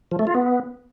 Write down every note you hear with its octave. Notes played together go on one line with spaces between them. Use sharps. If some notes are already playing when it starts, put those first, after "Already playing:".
F3
A3
F4
B3